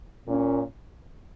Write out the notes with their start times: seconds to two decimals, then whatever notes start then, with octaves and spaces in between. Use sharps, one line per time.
0.27 A#2 A#3 C#4